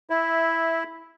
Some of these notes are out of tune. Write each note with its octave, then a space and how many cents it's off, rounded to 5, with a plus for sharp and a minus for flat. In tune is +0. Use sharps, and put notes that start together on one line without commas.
E4 +0 E5 -10